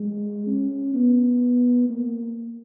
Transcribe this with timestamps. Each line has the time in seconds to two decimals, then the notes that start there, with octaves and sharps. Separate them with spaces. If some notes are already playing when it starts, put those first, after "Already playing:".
Already playing: G#3
0.46 C#4
0.94 B3
1.89 A#3